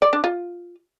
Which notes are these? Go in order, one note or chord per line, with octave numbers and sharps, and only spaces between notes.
D5
D4
F4